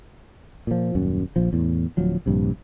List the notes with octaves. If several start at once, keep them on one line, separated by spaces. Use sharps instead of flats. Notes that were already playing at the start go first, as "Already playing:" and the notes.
A#2 F3
D#1 F#2
A#1 F3
E2 A2
D1 F3 F#3
A#1 G2 C3